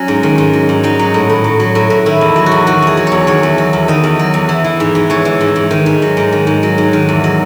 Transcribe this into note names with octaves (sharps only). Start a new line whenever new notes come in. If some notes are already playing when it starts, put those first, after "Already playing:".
Already playing: F#3 C#4
G#2
D#3
G#2
F#3
G#2
F#3 D#4
F#3
A2
A2
F#3
F#3
A2
A2
D#3 E4
E2
F#3
F#4
E2
D#3 F#4
E2 G#4
F#3
E2 C#5
D#3 C#5
E2
F#3
E2
D#3 D#5
E2
F#3
E2
E3
E3
G#2
G#2
E3 C#5
E3
G#2
G#2
D#3
G#2
F#3
G#2
D#3
G#2
F#3
G#2
D#3
E2
F#3